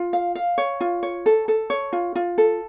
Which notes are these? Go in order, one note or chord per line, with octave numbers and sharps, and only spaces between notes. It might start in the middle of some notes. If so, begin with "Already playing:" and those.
Already playing: F4
F5
F5
C#5
F4
C#5
A4
A4
C#5
F4
F4
A4